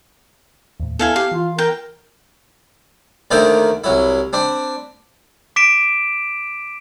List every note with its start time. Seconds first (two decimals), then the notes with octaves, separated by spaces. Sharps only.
0.80 D#2 A2
0.99 B3 E4 A4 F5 G#5
1.16 G4 F5
1.32 E3 F4
1.58 A#4 G5
3.31 D#2 D3 D#3 A3 A#4 C5
3.84 C2 F#3 E4
4.33 C4 D4 B5
5.56 D6 B6 D7 E7